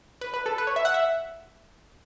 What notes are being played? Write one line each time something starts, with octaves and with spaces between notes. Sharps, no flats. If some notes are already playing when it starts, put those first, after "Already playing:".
B4
B4
A4
B4
C#5
E5
F#5
E5